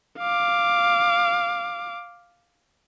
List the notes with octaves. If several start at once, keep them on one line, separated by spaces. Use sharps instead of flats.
F5 D6